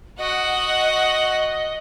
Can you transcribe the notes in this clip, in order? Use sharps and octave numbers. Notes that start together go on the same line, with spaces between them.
F#4 D#5 F#5